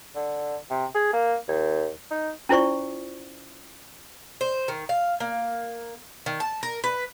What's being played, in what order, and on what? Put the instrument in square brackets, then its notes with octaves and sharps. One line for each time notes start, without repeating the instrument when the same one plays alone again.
[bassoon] D3
C3
G#4
A#3
D#2
D#4
[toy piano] C#4 E4 F4 C5 D5 C#6
[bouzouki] C5
D#3
F5
A#3
D#3
A5
A#4
B4